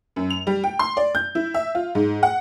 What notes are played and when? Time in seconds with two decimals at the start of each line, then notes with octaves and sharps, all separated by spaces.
0.16 F#2
0.30 F7
0.47 G3
0.64 G5
0.79 C6
0.97 D5
1.15 G6
1.35 E4
1.54 E5
1.75 F4
1.95 G#2
2.23 F#5